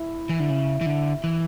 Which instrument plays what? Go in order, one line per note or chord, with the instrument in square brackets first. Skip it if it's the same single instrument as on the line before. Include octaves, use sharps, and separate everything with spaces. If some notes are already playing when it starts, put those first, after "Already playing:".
Already playing: [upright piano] E4
[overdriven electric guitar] E3
D3
C#3
E3
D3
E3